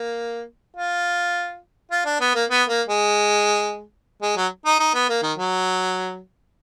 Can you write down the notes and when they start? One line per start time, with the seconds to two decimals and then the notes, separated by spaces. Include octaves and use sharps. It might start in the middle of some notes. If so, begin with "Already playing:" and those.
Already playing: A#3
0.76 F4
1.91 F4
2.06 D4
2.20 B3
2.35 A#3
2.49 B3
2.69 A#3
2.88 G#3
4.22 G#3
4.36 F#3
4.65 D#4
4.80 D#4
4.94 B3
5.09 A#3
5.23 D#3
5.38 F#3